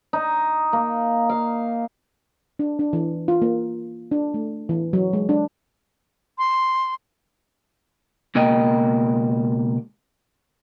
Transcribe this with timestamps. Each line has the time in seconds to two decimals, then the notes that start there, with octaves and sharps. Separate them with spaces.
0.13 D#4
0.73 A#3
1.29 F5
2.59 D4
2.79 D4
2.93 E3
3.28 F4
3.42 A#3
4.11 D4
4.34 A3
4.69 E3
4.93 F#3
5.13 G#3
5.29 D4
6.38 C6
8.35 C#2 B2 A#3 A#4 D#5 G5